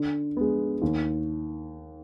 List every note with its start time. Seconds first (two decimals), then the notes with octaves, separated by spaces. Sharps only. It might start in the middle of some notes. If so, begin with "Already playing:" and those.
Already playing: D3
0.37 G#3 B3
0.82 D#2